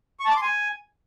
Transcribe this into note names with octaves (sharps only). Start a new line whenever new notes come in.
C#6
A5
D6
C6
G#5